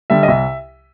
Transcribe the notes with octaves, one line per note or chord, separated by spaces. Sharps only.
D3 G3 E5
D#5
C2 E5